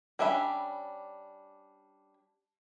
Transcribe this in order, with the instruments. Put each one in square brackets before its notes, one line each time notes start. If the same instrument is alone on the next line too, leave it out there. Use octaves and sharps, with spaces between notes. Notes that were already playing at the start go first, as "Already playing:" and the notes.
[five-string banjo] G3 C#4 D4 E5 B5